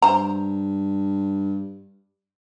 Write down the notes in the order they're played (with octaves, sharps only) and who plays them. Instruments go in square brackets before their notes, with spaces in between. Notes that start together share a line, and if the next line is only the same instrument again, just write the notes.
[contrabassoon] G2 [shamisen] C5 A#5